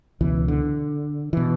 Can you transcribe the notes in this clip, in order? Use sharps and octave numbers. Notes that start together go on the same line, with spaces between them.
C#2 B2 E3
D3
B2 E3